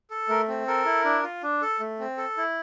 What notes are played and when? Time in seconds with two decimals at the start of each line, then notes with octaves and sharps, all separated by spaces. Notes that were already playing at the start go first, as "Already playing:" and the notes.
0.11 A4
0.29 A3 A#4
0.48 C4
0.67 A4 A#4
0.85 E4
1.05 D4
1.23 F4
1.43 D4
1.62 A4
1.80 A3
2.00 C4
2.17 A4
2.37 E4